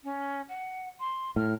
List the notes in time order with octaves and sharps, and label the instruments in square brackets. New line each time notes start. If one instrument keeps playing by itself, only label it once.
[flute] C#4
F#5
C6
[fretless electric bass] A2 [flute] F6